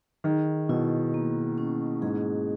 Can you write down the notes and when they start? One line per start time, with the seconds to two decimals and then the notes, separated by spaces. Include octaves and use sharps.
0.24 D#3 G#4
0.69 B2 E4
1.14 A#3
1.58 C#4
2.02 G#2 G#4